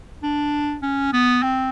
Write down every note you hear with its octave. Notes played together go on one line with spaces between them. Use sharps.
D4
C#4
B3
C4